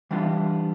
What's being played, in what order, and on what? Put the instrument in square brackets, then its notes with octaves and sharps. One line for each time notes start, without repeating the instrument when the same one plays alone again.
[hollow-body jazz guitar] E3 G3 B3 D4 F4